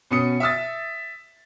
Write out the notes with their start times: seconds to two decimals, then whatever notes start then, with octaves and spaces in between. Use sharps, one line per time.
0.11 B2 C#4 D#6 C#7
0.40 E5 D#6 E6 A6